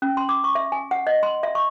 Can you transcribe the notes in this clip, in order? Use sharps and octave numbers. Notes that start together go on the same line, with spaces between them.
C#4
C6
D6
C#6
E5
G#5
F#5
D#5
C6
E5
C#6